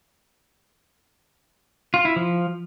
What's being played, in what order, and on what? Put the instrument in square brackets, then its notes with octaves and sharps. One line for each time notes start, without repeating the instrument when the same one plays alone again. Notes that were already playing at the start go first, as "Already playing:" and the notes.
[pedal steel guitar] F4
E4
F3